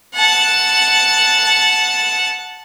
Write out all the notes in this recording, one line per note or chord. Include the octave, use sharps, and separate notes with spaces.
F#5 A5